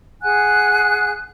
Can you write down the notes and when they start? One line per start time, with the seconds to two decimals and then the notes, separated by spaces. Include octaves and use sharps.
0.23 G#4 F#5 G#5 F#6